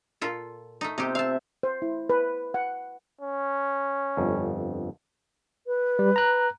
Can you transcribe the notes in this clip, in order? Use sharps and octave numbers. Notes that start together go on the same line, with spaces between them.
A#2 F4 A4
A3 D#4
C3 D#4 G4
E5 F5 A5
C5
E4
B4
F#5
C#4
G1 F2
B4
G3
A#5 F#6